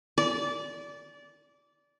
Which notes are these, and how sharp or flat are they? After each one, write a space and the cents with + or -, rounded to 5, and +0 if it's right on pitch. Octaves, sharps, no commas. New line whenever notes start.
D5 -20